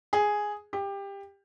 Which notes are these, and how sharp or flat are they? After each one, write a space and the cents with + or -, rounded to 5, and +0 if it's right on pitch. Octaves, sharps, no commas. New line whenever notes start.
G#4 +0
G4 +20